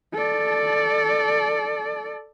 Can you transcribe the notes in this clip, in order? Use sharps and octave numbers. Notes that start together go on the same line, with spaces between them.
A4 D5